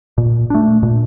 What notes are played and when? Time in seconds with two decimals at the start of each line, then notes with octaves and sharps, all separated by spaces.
0.18 A#2
0.50 A3 D4
0.83 A#2